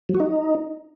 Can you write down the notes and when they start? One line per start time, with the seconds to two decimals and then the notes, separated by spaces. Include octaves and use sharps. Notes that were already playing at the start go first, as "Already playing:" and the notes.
0.09 F#3
0.14 F#4
0.20 D#4